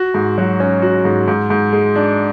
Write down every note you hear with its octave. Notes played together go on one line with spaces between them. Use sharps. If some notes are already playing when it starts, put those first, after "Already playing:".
Already playing: F#4
G#2
F#3
C#4
F#4
G#2
G#2
G#2
G#3
D4